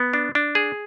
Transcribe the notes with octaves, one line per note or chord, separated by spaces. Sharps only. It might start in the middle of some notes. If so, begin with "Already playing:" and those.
Already playing: B3
D4
D4
G#4